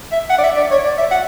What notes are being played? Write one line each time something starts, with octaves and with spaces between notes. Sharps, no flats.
E5
F#5
D5
E5
D5
C#5
D5
E5
F#5